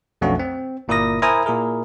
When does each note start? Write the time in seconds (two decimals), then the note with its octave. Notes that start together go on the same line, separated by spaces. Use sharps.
0.21 B1 F2 A3 C#4 D4 F#4
0.39 C4
0.88 G1 A#2 E4 A#4 D#6 A#6
1.22 E4 A#4 C5 G#5 A#5 D#6
1.46 A#2 E4 G#4 A#4